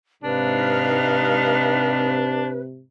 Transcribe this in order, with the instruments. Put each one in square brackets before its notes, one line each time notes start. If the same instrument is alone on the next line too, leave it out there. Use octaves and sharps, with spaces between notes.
[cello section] G#2 D#4 F5 [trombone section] C3 [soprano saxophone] D4 [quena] B4